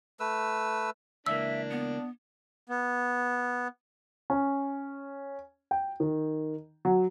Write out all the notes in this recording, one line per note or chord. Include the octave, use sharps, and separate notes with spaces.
A3 B4 E6
C#2 E3 A#3 D4 E5 E6
B3
B3
C#4
G5
D#3
F#3